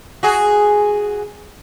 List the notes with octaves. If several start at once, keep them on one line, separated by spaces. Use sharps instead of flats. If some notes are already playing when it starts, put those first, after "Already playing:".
F#4 G#4